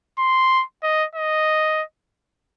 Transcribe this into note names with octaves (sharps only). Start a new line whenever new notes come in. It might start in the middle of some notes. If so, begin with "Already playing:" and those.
C6
D#5
D#5